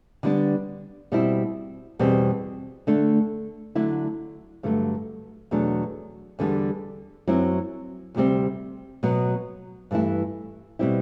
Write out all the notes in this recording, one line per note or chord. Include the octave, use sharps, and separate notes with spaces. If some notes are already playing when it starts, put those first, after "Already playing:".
D3 G3 B3 D4
B2 G3 C4 E4
E2 B2 G3 C4
D3 A3 D4
D3 F#3 A3 E4
G2 D3 F#3 A3
E2 B2 F#3 A3 D4
E2 D3 G3 B3
F#2 F#3 C4 E4
D2 C3 G3 C4
B2 F#3 B3
G2 E3 A3 E4
B2 G3 C4 E4